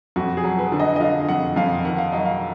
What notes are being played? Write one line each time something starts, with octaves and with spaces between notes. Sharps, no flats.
F2 F#4
G#4
F#3
B4
D3
D#5
D#5
D3 F5
F2 F#5
F2 F5
D#3 F#5
F5
F#3 D#5
F5